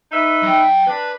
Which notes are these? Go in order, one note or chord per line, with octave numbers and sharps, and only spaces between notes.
D#4 B4 E5
F#3 G5
D4 B4